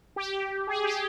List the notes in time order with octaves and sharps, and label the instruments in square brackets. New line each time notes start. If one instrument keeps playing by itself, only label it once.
[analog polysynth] G4
G#4
G4